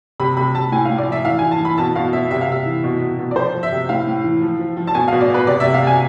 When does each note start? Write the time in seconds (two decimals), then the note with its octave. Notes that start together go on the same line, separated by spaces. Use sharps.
0.20 C3 B5
0.37 C3 B5
0.55 C3 A5
0.72 A2 G#5
0.85 F5
0.90 A2
0.98 D5
1.07 F3 E5
1.25 E3 F5
1.39 E3 G#5
1.51 A5
1.61 E3 B5
1.78 B2 A5
1.96 B2 F5
2.13 B2 E5
2.31 C3 E5
2.41 F5
2.48 C3 E5
2.66 E3
2.84 B2
3.01 B2
3.19 B2
3.31 D5
3.36 F3 C5
3.54 F3
3.63 E5
3.72 C3
3.89 A2 F5
4.07 A2
4.24 E3
4.42 F3
4.59 F3
4.77 F3
4.87 A5
4.95 B2 G#5
5.08 F5
5.12 B2
5.21 D5
5.30 B2 B4
5.47 C3 D5
5.60 E5
5.65 C3
5.74 F5
5.83 C3 G#5